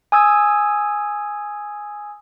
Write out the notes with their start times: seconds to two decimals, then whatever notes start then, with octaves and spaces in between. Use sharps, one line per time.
0.12 G#5 D#6 E6 G#6